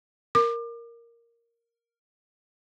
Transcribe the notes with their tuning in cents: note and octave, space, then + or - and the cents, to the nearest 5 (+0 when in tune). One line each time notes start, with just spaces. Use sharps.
A#4 +0 D6 +30